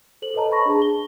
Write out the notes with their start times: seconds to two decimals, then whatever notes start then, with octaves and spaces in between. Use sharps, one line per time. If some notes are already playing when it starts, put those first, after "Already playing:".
0.22 A4 C5 F#7
0.34 A4 B4 C#5 D#5 A5 A#5
0.51 A5 B5 C#6 A#6
0.66 D4 G#4 A5
0.82 G7